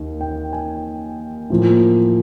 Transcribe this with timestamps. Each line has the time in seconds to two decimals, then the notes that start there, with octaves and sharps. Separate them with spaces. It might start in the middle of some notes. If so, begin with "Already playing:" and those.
Already playing: D#2 D#3
0.21 G5
0.53 G#5
1.50 A2 F3 A#3